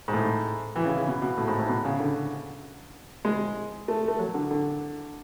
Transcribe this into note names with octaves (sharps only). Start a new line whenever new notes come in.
G#2
A2
E3
C#3
C#3
B2
B2
A2
G#2
A2
B2
C#3
D3
G#3
A3
A3
F#3
D3
D3